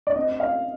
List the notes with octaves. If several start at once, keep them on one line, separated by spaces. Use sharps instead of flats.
D5
C4 D#5
F5